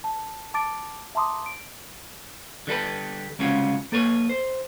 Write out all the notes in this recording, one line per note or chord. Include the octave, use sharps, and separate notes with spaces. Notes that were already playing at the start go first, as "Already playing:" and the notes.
A5
A5 D6 A6 D7
E5 A5 A#5 C6 D6 D#6
D7
D3 G3 A4 B4
C2 C#3 G#3 C#4 F4 F#4
A#3 A4 B4 C#5
C5